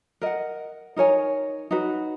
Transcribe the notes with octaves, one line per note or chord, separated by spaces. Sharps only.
A#4 D#5 F#5
D#4 A#4 C#5 G#5
D#4 F#4 B4